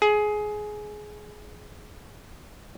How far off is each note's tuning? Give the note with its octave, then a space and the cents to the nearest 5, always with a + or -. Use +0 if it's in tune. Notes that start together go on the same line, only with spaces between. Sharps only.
G#4 +15